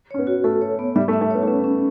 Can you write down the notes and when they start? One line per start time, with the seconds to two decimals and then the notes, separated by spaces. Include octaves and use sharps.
0.11 C#4 C#5
0.19 B3
0.27 F#4
0.44 A3 A4
0.61 C#5
0.79 B3
0.96 G3 E5
1.08 A3
1.13 E5
1.21 A3
1.31 B3 C#5
1.43 A3
1.47 B3 C#4
1.64 C#4